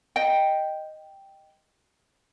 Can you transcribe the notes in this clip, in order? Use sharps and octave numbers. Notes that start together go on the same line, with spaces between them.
D#5 G5